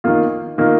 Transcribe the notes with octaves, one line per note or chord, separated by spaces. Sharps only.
D#3 A#3 F4
D#3 A#3 F4